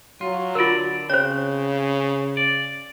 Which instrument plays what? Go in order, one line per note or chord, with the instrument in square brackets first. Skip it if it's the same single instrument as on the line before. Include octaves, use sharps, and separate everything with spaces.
[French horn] F#3 [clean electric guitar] F4
[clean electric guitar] D3 D5 [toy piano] F4 A#4
[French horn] C#3 [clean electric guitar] C4 [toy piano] C5 C#5
[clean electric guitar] D5